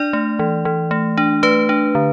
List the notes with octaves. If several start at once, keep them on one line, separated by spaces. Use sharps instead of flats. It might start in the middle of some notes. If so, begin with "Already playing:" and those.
Already playing: D4 D5
A3
E3
E3
A3
D4
A3 B4
D4
D3